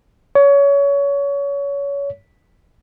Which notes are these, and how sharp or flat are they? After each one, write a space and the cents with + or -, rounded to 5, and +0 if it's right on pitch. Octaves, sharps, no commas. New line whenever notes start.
C#5 +25